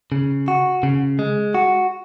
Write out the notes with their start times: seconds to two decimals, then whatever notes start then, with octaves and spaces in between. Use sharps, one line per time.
0.12 C#3
0.48 F#4
0.83 C#3
1.19 G#3
1.55 F#4